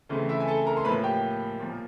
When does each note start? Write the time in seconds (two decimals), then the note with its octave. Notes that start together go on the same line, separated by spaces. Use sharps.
0.09 C#3 E3 A3 C4
0.29 E4 E5
0.40 G#5
0.48 A4 A5
0.65 A#4 A#5
0.77 C6
0.84 A2 F3 A#3 B4 B5
1.03 G4 G5
1.60 A#2 F3 A#3